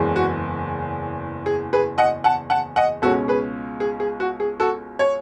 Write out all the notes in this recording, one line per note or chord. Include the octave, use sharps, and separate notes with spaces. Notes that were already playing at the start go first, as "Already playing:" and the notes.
Already playing: F#1 E2 C#3 G#3
F#4
G#4
G#4 B4
D#5 F#5
F#5 A5
F#5 A5
D#5 F#5
C#2 B2 G#3 C#4 F#4 A4
G#4 B4
G#4
G#4
F#4
G#4
F#4 A4
C#5